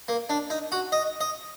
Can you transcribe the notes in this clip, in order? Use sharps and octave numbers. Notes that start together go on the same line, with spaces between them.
A#3
D4
D#4
F#4
D#5
D#5